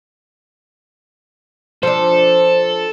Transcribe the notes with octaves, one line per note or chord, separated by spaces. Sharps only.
F3 D4 A4 C5